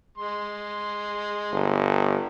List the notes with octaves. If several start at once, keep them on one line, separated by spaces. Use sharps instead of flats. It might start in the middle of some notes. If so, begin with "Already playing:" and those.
G#3 C6
G1